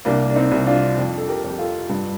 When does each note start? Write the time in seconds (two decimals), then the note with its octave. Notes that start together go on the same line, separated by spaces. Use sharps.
0.05 C2 A#3 D4
0.30 D4
0.36 C4 D#4
0.52 C2
0.66 D4 F4
0.98 F2
1.18 A4
1.28 G4 A#4
1.44 F2
1.51 G4
1.59 F4 A4
1.90 G2